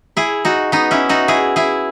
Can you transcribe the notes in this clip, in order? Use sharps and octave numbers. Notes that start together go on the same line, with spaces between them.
E4 G#4
D#4 F#4
B3 D#4
C#4 E4
D#4 F#4
E4 G#4
E4 G#4